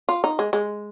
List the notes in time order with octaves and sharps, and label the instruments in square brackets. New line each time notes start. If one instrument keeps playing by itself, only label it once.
[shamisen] F4
D#4
G#3
G#3